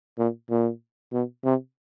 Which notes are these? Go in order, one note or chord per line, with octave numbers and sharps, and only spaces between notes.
A#2
A#2
B2
C3